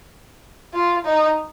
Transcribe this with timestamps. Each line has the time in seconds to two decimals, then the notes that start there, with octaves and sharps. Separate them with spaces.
0.74 F4
1.05 D#4